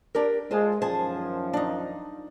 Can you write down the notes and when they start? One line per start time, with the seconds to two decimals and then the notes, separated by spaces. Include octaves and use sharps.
0.15 D4 G4 A#4
0.51 G#3 F4 C5 A5
0.82 F#2 D#3 F3 G#4 C5 A5
1.53 D4 D#4